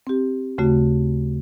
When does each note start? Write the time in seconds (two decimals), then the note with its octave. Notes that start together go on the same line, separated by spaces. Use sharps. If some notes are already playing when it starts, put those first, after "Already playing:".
0.07 C4 G4
0.58 D#2 C#3 A3 F#4